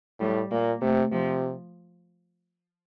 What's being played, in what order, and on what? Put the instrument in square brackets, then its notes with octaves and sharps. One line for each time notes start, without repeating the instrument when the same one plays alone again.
[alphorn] A2 [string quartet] G3
[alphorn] A#2 [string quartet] A#3
[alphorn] C3 [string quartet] A3
[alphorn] C3 [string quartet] F3